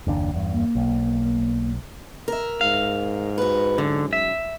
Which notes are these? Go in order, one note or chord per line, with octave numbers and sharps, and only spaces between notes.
F#1 D#2 D4
E2 G2
A#3
B1
A#4 E5
G#2 F5
F#4 B4
F#2 D3
E5